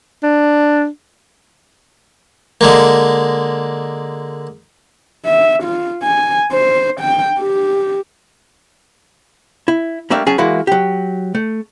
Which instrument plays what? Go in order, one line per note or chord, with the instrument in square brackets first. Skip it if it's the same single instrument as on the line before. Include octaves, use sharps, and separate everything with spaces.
[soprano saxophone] D4
[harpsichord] D3 G#3 A#3
[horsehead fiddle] E5
F4
G#5
C5
G5
G4
[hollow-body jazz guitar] E4
G3 A3 A#3 D4 E5 F5
F#3 C#4 G#4 G#5 A5
E3 G#3 A#3 E4 F#4
F#3 G4
A3